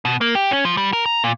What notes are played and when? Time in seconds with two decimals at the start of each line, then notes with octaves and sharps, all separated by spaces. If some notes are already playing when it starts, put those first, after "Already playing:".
0.05 B2
0.21 A#3
0.35 G4
0.51 C#4
0.65 F3
0.77 G3
0.93 A#4
1.06 A#5
1.24 A#2